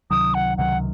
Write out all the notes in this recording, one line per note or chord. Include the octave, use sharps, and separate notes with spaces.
C#2 C3 D#3 F#3 D#6
F#5
C#2 C3 D#3 F#3 F#5